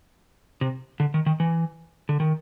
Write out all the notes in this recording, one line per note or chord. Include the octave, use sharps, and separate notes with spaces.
C3
D3
D#3
D#3
E3
D3
D#3